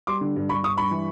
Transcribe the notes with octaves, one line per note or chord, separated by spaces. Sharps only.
G3 C6 D6
D3
G2
G2 B5 C#6
G2 C#6 D#6
G2 B5 C#6
E3